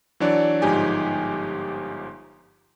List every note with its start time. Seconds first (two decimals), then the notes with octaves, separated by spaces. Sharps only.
0.20 E3 F#3 D4 C#5 D5
0.62 G1 G#2 F3 D#4 G4 G#5